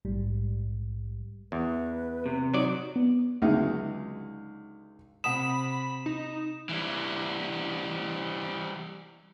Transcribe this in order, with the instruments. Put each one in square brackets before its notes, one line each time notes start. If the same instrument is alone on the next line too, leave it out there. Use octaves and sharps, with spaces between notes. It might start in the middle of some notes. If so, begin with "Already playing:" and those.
[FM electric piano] A#1 G#2 G3
[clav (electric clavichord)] E2 [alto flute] B4
[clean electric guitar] C3
[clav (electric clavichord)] F#3 D5 [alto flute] D#4
[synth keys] B3
[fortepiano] C#2 D3 F#3 G#3 D#4 E5
[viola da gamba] C3 [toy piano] F#5 A5 D#6 [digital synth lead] B5 [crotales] E7
[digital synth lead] D#4
[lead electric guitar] E3 G3